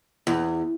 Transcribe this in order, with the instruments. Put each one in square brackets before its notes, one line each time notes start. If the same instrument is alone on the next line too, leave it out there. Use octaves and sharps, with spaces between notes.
[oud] E2